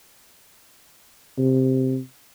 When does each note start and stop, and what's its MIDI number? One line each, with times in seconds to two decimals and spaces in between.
1.38 1.98 48